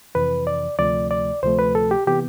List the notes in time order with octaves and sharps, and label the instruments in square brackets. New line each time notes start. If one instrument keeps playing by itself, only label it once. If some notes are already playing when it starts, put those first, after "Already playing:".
[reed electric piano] F2 C3 E3 B4
D5
D2 C3 F3 A3 D5
D5
D2 C3 F3 A3 C5
B4
A4
G4
C3 E3 B3 G4